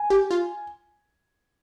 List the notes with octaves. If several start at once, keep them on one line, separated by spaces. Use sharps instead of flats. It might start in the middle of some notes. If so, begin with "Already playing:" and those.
Already playing: G#5
G4
F4